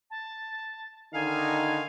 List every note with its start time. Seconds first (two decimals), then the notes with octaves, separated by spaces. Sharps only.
0.10 A5
1.14 D3 D#3 D#4 F5 G#5